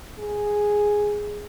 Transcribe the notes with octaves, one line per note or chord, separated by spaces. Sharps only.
G#4